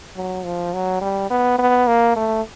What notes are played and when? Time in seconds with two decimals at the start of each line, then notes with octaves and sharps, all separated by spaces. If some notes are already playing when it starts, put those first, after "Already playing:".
0.16 F#3
0.44 F3
0.74 F#3
1.01 G3
1.30 B3
1.58 B3
1.87 A#3
2.16 A3